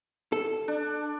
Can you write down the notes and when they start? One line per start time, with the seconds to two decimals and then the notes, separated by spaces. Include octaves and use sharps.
0.32 A4
0.68 D4